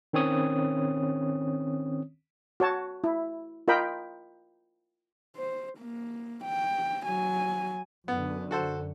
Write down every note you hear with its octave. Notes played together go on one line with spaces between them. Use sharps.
D#3 C4 C#4 C#5 D#6
F#4 C#5 A5
E4
F4 A#4 D#5 G5 B5
C5
A#3
G5
F#3 G#5
F#2 D3 B3
F#4 A4 C5